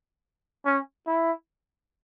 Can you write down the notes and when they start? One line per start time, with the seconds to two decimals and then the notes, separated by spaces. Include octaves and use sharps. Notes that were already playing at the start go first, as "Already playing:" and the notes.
0.66 C#4
1.07 E4